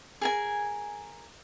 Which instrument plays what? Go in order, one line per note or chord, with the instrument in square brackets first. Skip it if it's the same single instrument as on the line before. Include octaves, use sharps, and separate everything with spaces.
[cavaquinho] G#4 A#4 G#5